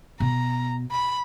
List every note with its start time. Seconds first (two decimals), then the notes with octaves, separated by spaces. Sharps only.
0.20 B2 A#5
0.91 B5